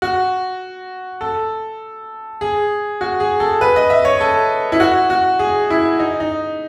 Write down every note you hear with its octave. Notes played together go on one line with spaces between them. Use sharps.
F#4
A4
G#4
F#4
G#4
A4
B4
D#5
E5
C#5
A4
E4
F#4
F#4
G#4
E4
D#4
D#4